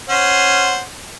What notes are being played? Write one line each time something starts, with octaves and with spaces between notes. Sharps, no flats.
C#4 C5 F#5